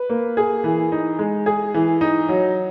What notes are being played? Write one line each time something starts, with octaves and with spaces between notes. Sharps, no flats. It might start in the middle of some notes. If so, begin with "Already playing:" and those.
Already playing: B4
A#3
G#4
E3
D#4
G#3
G#4
E3
D#4
F#3